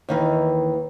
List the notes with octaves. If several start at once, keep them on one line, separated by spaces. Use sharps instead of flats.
D#2 D#3 E3